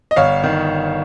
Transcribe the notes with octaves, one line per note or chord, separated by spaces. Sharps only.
D#5
G1 C#5 F5
D#3